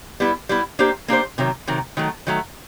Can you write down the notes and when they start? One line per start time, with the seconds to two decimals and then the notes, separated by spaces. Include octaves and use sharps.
0.20 G3 B3 E4
0.49 G3 B3 E4
0.79 A#3 D4 G4 C5
1.08 A#3 D4 G4 C5
1.38 C3 D#3 F#3
1.68 C3 D#3 F#3
1.97 D#3 F#3 A3
2.27 D#3 F#3 A3